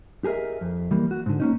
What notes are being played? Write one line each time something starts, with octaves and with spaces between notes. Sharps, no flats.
G4 G#4 A#4 D#5 E5
F2
E3 G3 A#3
F#4
G#2 D3
A#3 C#4 D#4